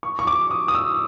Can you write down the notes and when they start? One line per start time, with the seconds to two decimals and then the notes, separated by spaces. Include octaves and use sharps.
0.03 C#6
0.19 C#6
0.27 D6
0.51 D#6
0.68 D#6
0.75 E6